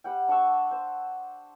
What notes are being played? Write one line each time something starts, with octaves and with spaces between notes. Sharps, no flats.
G3 F#5 G5
D4 F#5 C#6 E6
C5